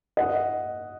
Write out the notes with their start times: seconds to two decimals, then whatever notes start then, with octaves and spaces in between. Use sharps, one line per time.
0.17 D#5 F#5